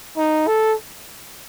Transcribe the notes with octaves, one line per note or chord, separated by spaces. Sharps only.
D#4
A4